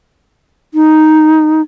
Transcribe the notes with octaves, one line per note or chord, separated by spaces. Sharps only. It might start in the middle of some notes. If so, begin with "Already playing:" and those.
D#4